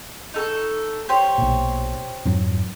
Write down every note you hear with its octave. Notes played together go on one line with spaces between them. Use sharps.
D#4 A4 C#6
G4 C5 C#5
B1 A#2
F2 G#2 F#3